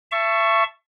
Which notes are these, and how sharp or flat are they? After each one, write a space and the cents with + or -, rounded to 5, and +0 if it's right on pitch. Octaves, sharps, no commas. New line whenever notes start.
E5 +30 A5 +0 C#6 +0